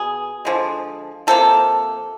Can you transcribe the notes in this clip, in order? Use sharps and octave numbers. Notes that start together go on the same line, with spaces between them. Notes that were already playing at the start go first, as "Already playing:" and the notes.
Already playing: B2 G#4
D3 F3 G#3
C3 F3 A#3 A4